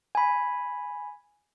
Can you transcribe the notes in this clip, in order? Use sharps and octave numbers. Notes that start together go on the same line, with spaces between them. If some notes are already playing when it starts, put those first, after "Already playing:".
G#5 B5